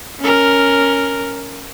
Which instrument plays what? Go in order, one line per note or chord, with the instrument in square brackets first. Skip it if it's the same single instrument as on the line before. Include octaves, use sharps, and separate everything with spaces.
[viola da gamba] C#4 A#4